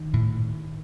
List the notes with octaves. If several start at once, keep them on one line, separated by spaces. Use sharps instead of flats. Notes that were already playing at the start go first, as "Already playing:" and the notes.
Already playing: D#3
A2